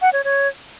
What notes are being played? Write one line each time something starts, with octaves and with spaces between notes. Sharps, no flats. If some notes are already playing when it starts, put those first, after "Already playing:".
F#5
C#5
C#5